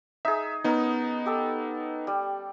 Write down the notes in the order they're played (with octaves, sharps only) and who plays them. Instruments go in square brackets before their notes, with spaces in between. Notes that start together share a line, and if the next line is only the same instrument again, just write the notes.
[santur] D#4 G#4 [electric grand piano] E5
[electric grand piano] B3 D#4 [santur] C#4 A#4
[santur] G4 A4 E6
G3